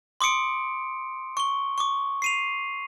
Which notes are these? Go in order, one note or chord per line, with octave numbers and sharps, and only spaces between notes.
C6 D6 D#6 C#7 D7
C#6 G7
C#6 D6
C7 D#7 F7